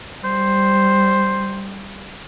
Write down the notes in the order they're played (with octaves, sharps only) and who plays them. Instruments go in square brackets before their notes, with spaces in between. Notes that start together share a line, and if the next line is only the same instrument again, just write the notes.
[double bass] G3 [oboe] C5